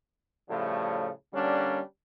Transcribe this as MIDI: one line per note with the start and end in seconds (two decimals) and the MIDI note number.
0.49 1.09 45
0.49 1.09 49
0.49 1.09 53
0.49 1.09 55
0.49 1.09 57
1.33 1.80 50
1.33 1.80 55
1.33 1.80 58
1.33 1.80 61
1.33 1.80 62